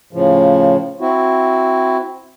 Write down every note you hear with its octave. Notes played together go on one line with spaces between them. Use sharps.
A2 C#3 F3
C4 E4 F#4